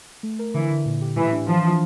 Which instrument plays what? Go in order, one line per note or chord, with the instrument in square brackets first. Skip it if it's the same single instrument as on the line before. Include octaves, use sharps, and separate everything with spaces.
[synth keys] A3
A#4
[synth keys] D3 [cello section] E3
[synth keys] D3
A#2
G4
[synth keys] A2 [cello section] E3
[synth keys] D4
[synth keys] E3 [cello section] F3
[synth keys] E3